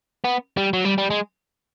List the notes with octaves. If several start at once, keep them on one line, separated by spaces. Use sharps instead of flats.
B3
G3
F#3
G3
G3
G#3